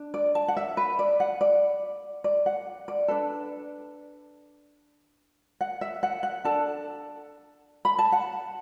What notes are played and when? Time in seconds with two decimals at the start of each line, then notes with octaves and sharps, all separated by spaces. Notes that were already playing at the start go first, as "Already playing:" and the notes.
Already playing: D4
0.14 D5
0.35 A5
0.48 F#5
0.57 E5
0.77 B4
0.99 D5
1.20 F#5
1.41 D5
2.24 D5
2.46 F#5
2.88 D5
3.08 D4 A4 B4
5.61 F#5
5.81 E5
6.03 F#5
6.23 F#5
6.44 D4 A4 A5
7.85 B5
7.99 A5
8.12 F#5